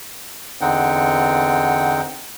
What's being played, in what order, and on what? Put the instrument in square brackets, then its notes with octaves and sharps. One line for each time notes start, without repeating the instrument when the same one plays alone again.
[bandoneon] E2 D3 C4 D#4 F#5 G5